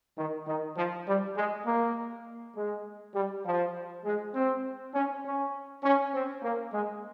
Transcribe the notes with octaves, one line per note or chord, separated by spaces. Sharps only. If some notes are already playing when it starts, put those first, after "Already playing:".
D#3
D#3
F3
G3
G#3
A#3
G#3
G3
F3
G#3
C4
C#4
C#4
C#4
C4
A#3
G#3